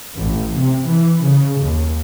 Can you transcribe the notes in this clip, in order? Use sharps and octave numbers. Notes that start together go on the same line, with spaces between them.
A1
C3
E3
C#3
D#2